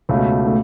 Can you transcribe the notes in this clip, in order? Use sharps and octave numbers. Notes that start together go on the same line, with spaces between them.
C#2 B2 A3
A3